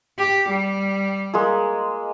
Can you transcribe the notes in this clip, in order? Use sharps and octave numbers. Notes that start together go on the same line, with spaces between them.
G4
G3
G#3 A#3 G#4